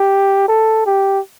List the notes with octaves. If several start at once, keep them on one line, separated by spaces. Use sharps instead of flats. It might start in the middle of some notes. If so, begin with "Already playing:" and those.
Already playing: G4
A4
G4